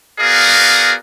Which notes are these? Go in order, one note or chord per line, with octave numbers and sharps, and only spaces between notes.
B3 F#4 G#4 A#4 D5 F5